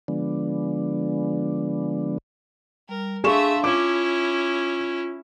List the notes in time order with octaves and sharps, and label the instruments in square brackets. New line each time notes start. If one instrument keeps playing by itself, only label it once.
[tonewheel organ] D3 F3 G#3 B3 D4
[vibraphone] G3 [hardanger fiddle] A#4
[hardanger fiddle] A3 E5 [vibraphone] D4 F5 C6 [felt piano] G#4 C#6 E7
[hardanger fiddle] C#4 E4 [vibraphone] F4 [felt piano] D6